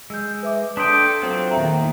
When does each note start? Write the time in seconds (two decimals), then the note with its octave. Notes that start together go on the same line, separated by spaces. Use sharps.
0.10 G#3 E6 G6
0.43 B4 E5 D6
0.77 D4 A4 G5 C6 D#6 B6
1.22 F#3 C4 F4
1.51 E2 A#2 D#3 E5 G5 A#5